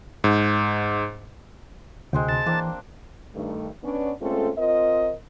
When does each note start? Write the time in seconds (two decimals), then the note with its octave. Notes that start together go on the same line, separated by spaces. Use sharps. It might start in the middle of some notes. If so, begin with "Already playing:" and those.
0.24 G#2
2.13 D2 C3 G#3 C4 G5
2.29 A5
2.46 E3 A#3 C4 D4
3.34 G2 D#3 A3
3.84 B3 C#4 D4
4.21 G#3 A3 C4 C#4 F4 A4
4.58 C4 F4 A#4 D#5